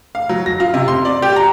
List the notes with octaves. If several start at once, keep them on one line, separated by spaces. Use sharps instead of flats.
F5
F#3
A#6
F4
C3
C6
D5
G4
A#5